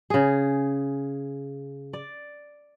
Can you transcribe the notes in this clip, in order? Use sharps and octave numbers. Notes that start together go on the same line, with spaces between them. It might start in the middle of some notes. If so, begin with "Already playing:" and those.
C#3 G#4
D5